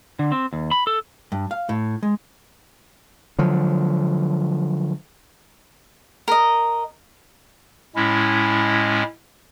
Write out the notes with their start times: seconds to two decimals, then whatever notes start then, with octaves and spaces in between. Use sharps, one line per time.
0.19 D3
0.32 C4
0.53 D#2
0.71 B5
0.87 A4
1.32 G2
1.51 F5
1.69 A2
2.03 G#3
3.39 D3 F3 F#3
6.28 A#4 D#5
7.96 A2 G#3 C#4 E4